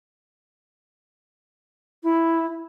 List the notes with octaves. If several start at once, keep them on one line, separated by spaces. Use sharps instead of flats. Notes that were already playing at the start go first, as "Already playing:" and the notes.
E4